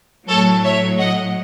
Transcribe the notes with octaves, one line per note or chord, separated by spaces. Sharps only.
A2 F#3 A4 C#5
C#5 E5
D#5 F#5